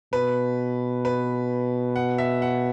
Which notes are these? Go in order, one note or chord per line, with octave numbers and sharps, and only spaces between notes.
B2 B4
B4
F#5
E5
F#5